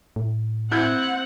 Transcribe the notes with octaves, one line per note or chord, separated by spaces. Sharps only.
A2
C4 E4 F#5 G6 G#6